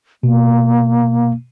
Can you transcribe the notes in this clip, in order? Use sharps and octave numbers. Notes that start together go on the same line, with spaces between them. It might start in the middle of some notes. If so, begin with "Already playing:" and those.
B2 A#3